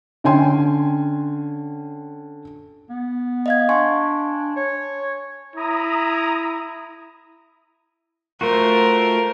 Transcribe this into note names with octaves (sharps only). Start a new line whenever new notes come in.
D3 C#4 G5 G#5 C6
B3
D#5 F5 G#6
D4 G#5 C6 C#6
C#5
E4 A#5 D#6
A3 F4 F#4 A#4 C5